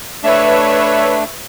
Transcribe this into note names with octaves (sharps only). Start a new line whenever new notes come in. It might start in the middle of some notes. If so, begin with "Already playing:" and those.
A3 D4 B4 C#5 E5